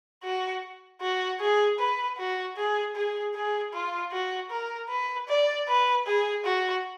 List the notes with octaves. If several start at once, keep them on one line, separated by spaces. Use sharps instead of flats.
F#4
F#4
G#4
B4
F#4
G#4
G#4
G#4
F4
F#4
A#4
B4
D5
B4
G#4
F#4